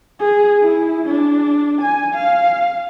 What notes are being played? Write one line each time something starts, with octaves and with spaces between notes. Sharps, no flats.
G#4
E4
D4
G#5
F5